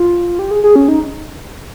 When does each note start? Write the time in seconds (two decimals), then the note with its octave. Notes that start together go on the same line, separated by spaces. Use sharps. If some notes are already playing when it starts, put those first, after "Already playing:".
Already playing: F4
0.39 G4
0.51 G#4
0.63 G#4
0.76 C#4
0.88 D#4